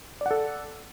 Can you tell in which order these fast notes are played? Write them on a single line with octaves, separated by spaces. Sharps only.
D5 F#5 A4